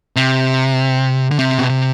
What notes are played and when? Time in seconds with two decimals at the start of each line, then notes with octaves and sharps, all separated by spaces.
0.16 C3
1.31 D3
1.39 C3
1.58 B2
1.69 C3